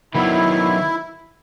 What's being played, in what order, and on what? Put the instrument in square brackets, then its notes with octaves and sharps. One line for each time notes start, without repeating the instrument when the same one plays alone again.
[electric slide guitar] D#3 F#3 B3 [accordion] E4